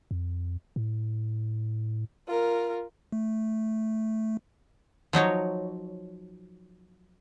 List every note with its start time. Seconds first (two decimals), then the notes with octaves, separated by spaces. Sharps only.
0.11 F2
0.76 A2
2.27 F4 A#4
3.12 A3
5.13 F3 F#3 D#4 C#5